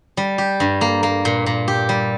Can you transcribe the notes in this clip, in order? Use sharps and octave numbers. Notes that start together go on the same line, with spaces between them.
G3
G4
G2
A#3
A#3
A#2
A#2
G4
G3